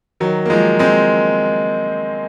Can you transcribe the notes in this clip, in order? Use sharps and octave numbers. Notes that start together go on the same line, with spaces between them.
D#3 F#3
A#3
F3 G#3
G#3 C4